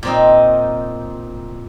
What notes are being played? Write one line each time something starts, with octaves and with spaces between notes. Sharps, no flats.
A#2 C4 D#4